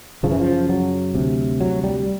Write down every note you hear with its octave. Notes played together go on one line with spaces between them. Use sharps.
F#2 C#3 F3
E3
F3
F#3
D2 C3
F#3
G3